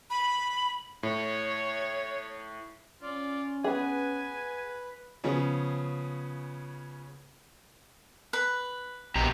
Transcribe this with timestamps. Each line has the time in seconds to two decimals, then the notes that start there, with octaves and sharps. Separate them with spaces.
0.10 B5
1.03 A2 C#5
3.03 C#4 F4 D5
3.64 B3 G#4 B4 G#5
5.24 C#3 F3 B3 C#4 G#4
8.33 B4 B5
9.16 A#1 B2 G4 A#5